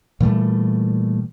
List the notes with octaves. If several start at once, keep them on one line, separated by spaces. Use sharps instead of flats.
A#2 E3 G3 A3